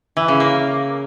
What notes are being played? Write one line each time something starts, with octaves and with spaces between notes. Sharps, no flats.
E3
C#3
A#3